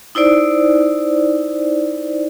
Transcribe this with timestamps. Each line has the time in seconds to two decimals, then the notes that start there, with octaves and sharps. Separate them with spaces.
0.15 D#4 E4 C5 D5